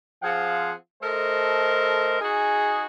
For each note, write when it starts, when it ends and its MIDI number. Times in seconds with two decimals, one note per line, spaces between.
0.23 0.72 53
0.23 0.72 60
0.23 0.72 68
0.23 0.72 77
0.23 0.72 78
1.02 2.19 57
1.02 2.19 69
1.02 2.19 70
1.02 2.19 72
1.02 2.19 75
2.21 2.85 63
2.21 2.85 66
2.21 2.85 68